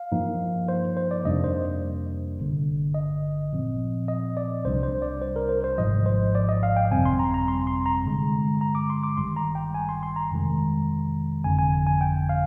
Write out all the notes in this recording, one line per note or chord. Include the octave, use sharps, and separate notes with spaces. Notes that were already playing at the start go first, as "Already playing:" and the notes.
Already playing: F5
G2 F3 A#3 D#4
C5
C5
D5
F2 C3 G3 A#3 D4 D#5
C5
G#1 G2 D3
D#5
A#2 F3 C4
D#5
D5
C2 C3 G3 D4 C5
C5
D5
C5
A#4
C5
C5
G#1 G#2 F3 D#5
C5
D5
D#5
F5
G5
G1 F2 C3 G3 C4 G#5
C6
A#5
A#5
C6
C6
A#5
G2 D3 G#3
A#5
D6
C6
D6
G#1 G2 D#3 G3 C6
A#5
G5
G#5
C6
C6
A#5
F2 C3 D#3 G#3
G1 F2 D3 G#5
G#5
G#5
G5
F5